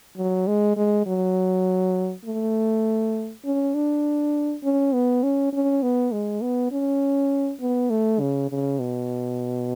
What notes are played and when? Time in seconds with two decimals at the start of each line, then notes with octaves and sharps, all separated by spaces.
0.18 F#3
0.47 G#3
0.77 G#3
1.06 F#3
2.25 A3
3.45 C#4
3.75 D4
4.64 C#4
4.94 B3
5.23 C#4
5.53 C#4
5.83 B3
6.12 G#3
6.42 B3
6.72 C#4
7.61 B3
7.90 A3
8.20 C#3
8.51 C#3
8.80 B2